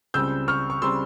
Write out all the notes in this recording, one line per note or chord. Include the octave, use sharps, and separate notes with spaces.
C#2 C#3 G3 C4 E6 G6
C#6 F6
C#6
C#3 G3 C4 C6 E6